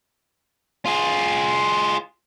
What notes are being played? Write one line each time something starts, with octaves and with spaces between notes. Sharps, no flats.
F4 G#4